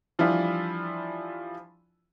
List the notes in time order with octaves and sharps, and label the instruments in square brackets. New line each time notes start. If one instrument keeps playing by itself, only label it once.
[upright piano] E3 F3 G3 D4 E4 F4